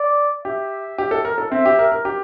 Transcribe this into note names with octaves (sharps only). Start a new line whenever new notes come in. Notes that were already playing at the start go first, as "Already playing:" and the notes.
Already playing: D5
G4 E5
G4
A4
A#4
A4
C4 E5
G4
A#4
A#4
G4